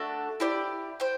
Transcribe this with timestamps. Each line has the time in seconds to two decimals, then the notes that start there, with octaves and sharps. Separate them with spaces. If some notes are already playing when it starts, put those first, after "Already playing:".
Already playing: A3 D4 F#4 A4
0.40 E4 G4 D5
1.00 C5 G5